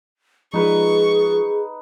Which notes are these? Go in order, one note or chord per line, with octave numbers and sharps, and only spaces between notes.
F3 G#3 D#4 F4 G#4 B4 C#6